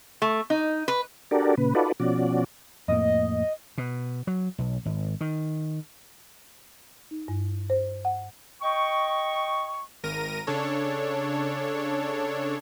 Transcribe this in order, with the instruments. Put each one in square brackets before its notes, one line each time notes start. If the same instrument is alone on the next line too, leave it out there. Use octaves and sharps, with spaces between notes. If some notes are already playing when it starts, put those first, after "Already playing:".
[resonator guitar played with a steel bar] A3
D#4
B4
[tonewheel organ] D4 F#4 G4 A4 A#4 D5
A#2 C#3 B4
D#4 F4 F#4 A4 B4 D5
B2 F3 C#4 F#4 D5
[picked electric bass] F2 A2 A#3 [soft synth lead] D#5
[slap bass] B2
F#3
B1
G#1
D#3
[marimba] D#4
G2
C5
F#5
[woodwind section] D#5 G5 C#6
[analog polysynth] G#1 A#4 A#6 D#7
C#3 D4 A4 C#5